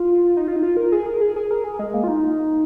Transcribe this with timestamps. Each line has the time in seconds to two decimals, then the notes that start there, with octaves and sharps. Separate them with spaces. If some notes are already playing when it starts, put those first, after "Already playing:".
Already playing: F4
0.37 D#4
0.48 F4
0.56 D#4
0.63 F4
0.77 A#4
0.92 G#4
1.06 A#4
1.21 G#4
1.36 G#4
1.51 A#4
1.64 G#4
1.79 G#3
1.94 A#3
2.04 F4
2.08 D#4